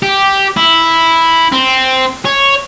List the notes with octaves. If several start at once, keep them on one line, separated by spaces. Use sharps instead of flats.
G4
E4
C4
C#5